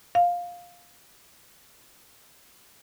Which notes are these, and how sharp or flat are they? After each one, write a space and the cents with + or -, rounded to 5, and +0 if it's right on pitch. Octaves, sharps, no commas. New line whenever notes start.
F5 +10